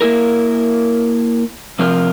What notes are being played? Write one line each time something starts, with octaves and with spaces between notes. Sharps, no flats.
A#3 E4 A#4
C3 F3 C4 F4 A#4